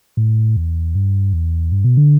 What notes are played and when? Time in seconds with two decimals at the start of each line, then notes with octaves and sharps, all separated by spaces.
0.17 A2
0.57 E2
0.95 G2
1.33 E2
1.72 G2
1.84 B2
1.97 D3